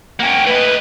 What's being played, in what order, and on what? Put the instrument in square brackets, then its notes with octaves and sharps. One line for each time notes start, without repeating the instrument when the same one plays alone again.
[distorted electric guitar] A#3 C#4 [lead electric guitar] F#5 G5
[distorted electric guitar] A3 D#5 [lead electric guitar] B4